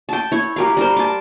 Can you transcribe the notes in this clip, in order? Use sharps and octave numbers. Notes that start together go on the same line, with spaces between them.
G5 A5
E4 C#5
G4 A#4 F5
G3 A#4 C5
A5 D6